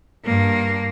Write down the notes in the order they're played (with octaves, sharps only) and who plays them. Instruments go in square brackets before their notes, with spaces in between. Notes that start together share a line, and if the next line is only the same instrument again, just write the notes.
[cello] G2 A#3